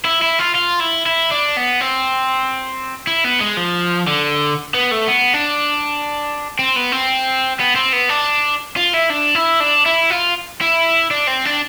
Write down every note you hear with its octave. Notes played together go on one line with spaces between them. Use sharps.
E4
E4
F4
F4
E4
E4
D4
B3
C4
E4
B3
G#3
F3
D3
B3
A3
B3
D4
C4
B3
C4
B3
C4
B3
D4
F4
E4
D4
E4
D4
E4
F4
E4
D4
C4
D4